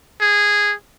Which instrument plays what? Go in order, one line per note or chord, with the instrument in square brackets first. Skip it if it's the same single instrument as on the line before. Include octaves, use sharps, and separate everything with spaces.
[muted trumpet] G#4